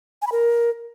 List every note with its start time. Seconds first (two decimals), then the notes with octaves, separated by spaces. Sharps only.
0.22 G#5
0.27 B5
0.32 A#4